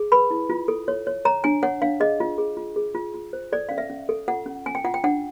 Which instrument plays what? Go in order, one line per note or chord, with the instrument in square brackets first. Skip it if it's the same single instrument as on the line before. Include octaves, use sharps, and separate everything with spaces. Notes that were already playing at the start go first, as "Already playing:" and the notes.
Already playing: [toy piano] G#4
B4 B5
E4
F4
A4
C#5
C#5
C#5 A#5
D4 G#5
C#5 F#5
D4 F5
G#4 D#5
F4
G#4
F4
G#4
F4
F4
C5
A4 D5
C#4 F5
E5
C#4
A4
F4 F#5
C#4
C#4 G#5
G5
F4 F#5
G5
D4 F#5